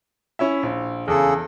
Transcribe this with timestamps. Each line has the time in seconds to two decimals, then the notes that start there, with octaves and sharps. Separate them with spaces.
0.39 C#4 E4 E5
0.63 A#1
1.08 E2 C#3 G#4 A4